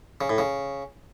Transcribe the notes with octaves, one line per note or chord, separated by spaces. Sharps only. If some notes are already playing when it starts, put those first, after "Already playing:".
C#3
A2
C#3